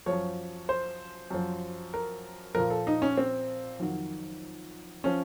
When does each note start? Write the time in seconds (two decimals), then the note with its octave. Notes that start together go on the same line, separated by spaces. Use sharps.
0.06 F3 C#5
0.12 F#2
0.69 C5
1.30 F#2 F3
1.94 A#4
2.55 A#2 F3 A#4
2.70 A4
2.87 D#4
3.02 C#4
3.18 C4
3.80 F2 D#3 F#3
5.04 F3 C#4